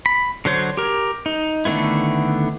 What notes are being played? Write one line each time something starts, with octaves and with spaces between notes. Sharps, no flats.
B5
D3 F#3 C5 C#5
G4 A#4
D#4
D3 D#3 A3 B3 E4